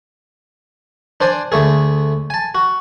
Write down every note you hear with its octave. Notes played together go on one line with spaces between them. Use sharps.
D4 C5 D5 G#5
D2 A3 G#4
G#5 A5
F#4